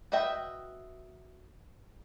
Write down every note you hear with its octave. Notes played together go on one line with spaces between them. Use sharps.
F#4 B4 D#5 E5 G5